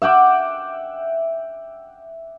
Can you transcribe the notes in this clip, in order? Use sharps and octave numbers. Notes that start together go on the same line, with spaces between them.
E5 F#5 G5 D6